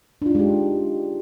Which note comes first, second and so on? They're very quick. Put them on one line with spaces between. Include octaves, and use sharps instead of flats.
D4 F4 D#4 G#3 G4